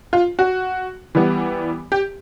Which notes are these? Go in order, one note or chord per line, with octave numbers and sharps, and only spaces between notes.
F4
F#4
E3 G3 B3
G4